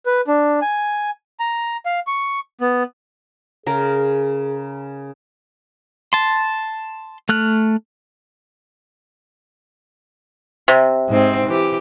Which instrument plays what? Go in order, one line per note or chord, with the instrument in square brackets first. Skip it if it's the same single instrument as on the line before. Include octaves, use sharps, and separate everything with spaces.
[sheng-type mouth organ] B4
D4
G#5
A#5
F5
C#6
B3
[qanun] C#3 A#4 [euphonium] G#4
[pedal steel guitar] A5 C6
A3 F6 F#6
[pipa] C3
[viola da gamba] G#2 C4
E3 G4